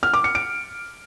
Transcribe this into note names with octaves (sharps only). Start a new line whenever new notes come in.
F6
D6
C#7
D7